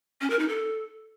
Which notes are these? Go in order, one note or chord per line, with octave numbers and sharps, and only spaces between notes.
C#4
A#4
D#4
A4